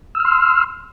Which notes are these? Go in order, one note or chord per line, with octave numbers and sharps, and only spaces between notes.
C6 E6 F6